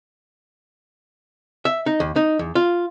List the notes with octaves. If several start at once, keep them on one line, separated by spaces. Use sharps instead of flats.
E5
D#4
D#2
D#4
E2
F4